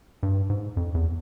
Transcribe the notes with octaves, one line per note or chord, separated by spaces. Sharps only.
G2
G#2
F2
E2